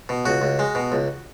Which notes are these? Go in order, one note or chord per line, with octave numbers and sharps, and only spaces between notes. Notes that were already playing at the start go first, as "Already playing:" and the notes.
B2
C#2 F#4
C#2
G#3
B2
C#2